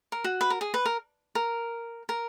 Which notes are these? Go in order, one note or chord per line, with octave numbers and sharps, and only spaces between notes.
A#4
F#4
B4
A#4
G#4
B4
A#4
A#4
A#4